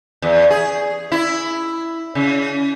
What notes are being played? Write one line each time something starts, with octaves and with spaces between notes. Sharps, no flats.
E2
G#4
E4
C#3